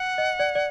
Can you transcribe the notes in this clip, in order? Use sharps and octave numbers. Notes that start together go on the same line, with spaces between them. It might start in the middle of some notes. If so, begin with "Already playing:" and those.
Already playing: F#5
D#5
D5
D5